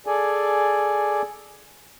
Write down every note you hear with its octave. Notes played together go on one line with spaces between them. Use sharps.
G#4 A4 D5 G#5